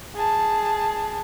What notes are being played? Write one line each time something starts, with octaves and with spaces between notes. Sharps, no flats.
G#4 A5